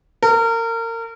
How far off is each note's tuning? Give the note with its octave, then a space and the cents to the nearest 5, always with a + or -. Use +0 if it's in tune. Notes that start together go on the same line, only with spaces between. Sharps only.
A#4 -30